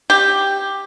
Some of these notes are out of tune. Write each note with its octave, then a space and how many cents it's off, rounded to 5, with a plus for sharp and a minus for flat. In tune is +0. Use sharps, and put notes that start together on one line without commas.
G4 +5